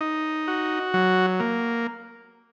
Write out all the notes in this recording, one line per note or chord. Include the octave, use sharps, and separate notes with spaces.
D#4
F#4
F#3
A#3